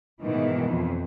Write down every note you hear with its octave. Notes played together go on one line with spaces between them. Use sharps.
G#2 B2 D#3 E3
F2